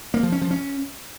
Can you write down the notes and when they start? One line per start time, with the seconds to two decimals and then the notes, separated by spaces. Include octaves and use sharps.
0.14 A#3
0.23 F3
0.32 C#4
0.41 F3
0.51 C#4